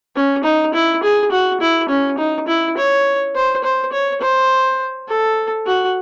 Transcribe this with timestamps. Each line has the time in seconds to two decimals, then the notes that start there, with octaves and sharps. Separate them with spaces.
0.16 C#4
0.44 D#4
0.74 E4
1.03 G#4
1.31 F#4
1.61 E4
1.89 C#4
2.18 D#4
2.48 E4
2.77 C#5
3.35 C5
3.64 C5
3.92 C#5
4.21 C5
5.08 A4
5.66 F#4